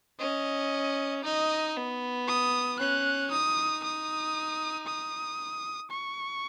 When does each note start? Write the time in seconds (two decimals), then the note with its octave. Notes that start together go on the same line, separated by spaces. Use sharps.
0.20 C#4 D#5
1.24 D#4 D#5
1.76 B3
2.27 D#6
2.79 C#4 F#6
3.31 D#4 D#6
3.84 D#6
4.87 D#6
5.91 C#6